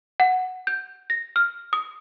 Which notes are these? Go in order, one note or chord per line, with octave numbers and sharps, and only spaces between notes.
F#5
G6
A#6
F6
D#6